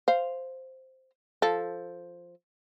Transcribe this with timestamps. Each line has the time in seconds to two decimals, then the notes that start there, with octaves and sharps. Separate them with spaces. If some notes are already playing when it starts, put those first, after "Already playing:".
0.08 C5 F5
1.42 F3 A4